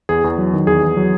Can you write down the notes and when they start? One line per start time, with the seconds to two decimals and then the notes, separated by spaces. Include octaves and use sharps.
0.09 E2 G#4
0.24 E2
0.38 F#3
0.54 D#3
0.67 E2 G#4
0.83 E2
0.97 F#3